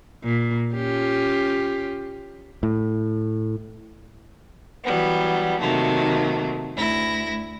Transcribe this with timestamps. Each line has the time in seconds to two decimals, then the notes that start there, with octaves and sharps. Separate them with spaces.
0.24 A#2
0.74 C#4 F4 G4
2.63 A2
4.84 E3 F#3 G3 B3
5.60 C3 D#3 F#3 A3 A#3
6.75 D2 E4 A#6